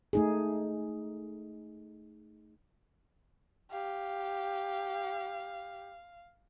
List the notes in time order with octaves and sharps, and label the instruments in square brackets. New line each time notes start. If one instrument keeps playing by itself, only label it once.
[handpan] A3 D#4 G#4
[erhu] G4 [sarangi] F5